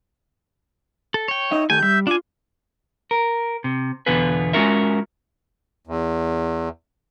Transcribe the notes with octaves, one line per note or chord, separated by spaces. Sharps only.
A4
C#5 G5
D#4 D#5 E5
D#3 A3 G4 G#5 G6
G3 E5
D4 F4 G#5 D6
A#4
C3
E2 B2 D3 F4 G#4 B4
G#3 C#4 F4 F#4 A#4 E5
E2